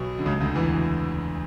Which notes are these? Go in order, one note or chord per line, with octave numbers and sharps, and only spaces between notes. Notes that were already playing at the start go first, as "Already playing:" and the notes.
Already playing: B1 B2
D3
C#2 C#3
D2 D3
E2 E3